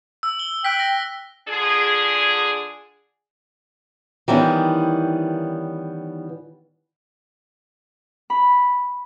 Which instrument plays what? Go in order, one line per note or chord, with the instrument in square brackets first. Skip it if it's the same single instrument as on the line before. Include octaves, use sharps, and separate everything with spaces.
[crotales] E6
G7
[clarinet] G5 [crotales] E6 F#6 B6
[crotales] A#6
[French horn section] D3 D4 F4 G#4
[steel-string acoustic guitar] D#3 E3 G3 B3 C#4
[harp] B5